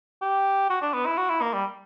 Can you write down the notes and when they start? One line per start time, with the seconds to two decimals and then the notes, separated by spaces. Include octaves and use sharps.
0.22 G4
0.70 F#4
0.82 D4
0.94 B3
1.06 E4
1.18 F#4
1.30 E4
1.42 A#3
1.54 G3